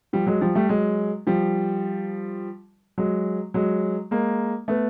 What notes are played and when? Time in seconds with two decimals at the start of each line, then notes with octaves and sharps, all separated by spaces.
0.13 F3 G3
0.27 F#3 G#3
0.41 F3 G3
0.55 G3 A3
0.69 F#3 G#3
1.27 F3 G3
2.98 F#3 G#3
3.54 F#3 G#3
4.11 G#3 A#3
4.68 A3 B3